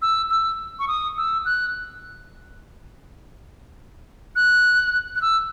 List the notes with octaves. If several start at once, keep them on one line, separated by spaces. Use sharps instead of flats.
E6
E6
C#6
D#6
E6
F#6
F#6
F#6
E6